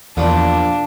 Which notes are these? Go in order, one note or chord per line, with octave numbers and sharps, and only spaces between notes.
E2 A#2 F3 G3 D4